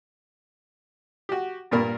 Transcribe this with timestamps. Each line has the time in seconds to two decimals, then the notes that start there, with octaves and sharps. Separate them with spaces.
1.29 F#4 G4
1.71 G2 A#2 A#4 B5